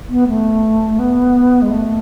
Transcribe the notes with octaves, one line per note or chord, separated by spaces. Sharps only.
B3
A3
B3
G#3
A3